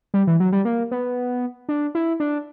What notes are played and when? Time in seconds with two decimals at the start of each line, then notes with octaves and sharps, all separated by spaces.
0.14 G3
0.27 E3
0.40 F#3
0.52 G3
0.65 A#3
0.91 B3
1.69 D4
1.95 E4
2.20 D4